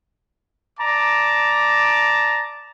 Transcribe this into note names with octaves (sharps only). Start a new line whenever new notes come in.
D5 A5 A#5 D6